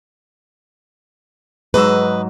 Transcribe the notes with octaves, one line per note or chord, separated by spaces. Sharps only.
G#2 F#3 B4 D#5 E6